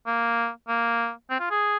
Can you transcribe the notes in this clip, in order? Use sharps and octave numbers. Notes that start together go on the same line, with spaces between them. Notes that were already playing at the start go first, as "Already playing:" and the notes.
A#3
A#3
C4
F4
G#4